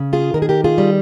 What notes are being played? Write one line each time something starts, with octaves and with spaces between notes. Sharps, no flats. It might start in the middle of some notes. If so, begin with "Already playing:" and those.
Already playing: C#3
F4 G#4
D#3 A#4
G#4
G4 A#4
F4 G#4
G3